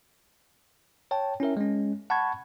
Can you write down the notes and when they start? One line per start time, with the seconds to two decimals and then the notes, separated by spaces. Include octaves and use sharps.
1.11 C#5 G5 A5
1.40 C#4 E4 A#4 E5
1.57 G#3 C#4
2.10 F#5 A5 B5 C#6 G#6